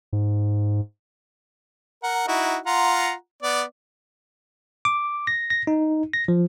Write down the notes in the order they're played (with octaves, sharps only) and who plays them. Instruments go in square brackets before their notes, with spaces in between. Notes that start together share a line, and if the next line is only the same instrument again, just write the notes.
[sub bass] G#2
[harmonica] A#4 F#5
D#4 E4 F#4
F4 F#5 A#5
B3 D5
[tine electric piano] D6
A#6
A#6
D#4
A#6
F3